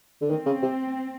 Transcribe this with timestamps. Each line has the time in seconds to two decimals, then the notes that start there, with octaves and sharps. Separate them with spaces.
0.21 D3
0.30 D#3 C4
0.46 C#3
0.62 C3